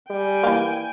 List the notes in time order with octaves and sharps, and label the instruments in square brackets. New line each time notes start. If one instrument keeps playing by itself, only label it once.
[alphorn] G3 [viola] G5 G#5
[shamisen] E3 A#3